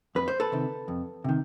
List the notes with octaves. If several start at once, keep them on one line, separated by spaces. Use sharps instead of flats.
F2 B4
C5
A4 B4
C3 D#3
F2
C3 D#3